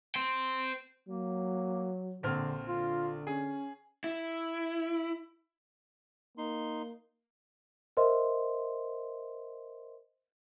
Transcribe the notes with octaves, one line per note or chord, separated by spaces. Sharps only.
C5 G5
F#3 A#3
A#1 D3 C4 F6
D3 F4
C#4 G#4
E4
A#3 D#4 C6
A#4 C5 D#5 E5 C6